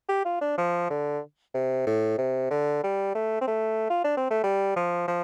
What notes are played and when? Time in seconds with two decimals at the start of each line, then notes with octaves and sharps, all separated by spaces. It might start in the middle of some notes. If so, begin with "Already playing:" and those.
0.09 G4
0.25 F4
0.41 D4
0.58 F3
0.90 D3
1.54 C3
1.86 A2
2.18 C3
2.50 D3
2.83 G3
3.15 A3
3.41 C4
3.47 A3
3.90 F4
4.04 D4
4.17 C4
4.30 A3
4.43 G3
4.76 F3
5.07 F3